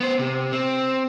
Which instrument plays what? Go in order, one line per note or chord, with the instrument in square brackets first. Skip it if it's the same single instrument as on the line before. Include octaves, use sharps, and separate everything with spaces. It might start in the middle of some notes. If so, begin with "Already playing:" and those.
[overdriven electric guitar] B3 C5
C3
C4